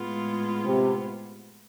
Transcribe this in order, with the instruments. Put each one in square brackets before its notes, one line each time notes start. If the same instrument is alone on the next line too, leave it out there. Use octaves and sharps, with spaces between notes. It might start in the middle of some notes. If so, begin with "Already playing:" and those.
Already playing: [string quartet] A2 G#3 B3 F4
[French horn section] C3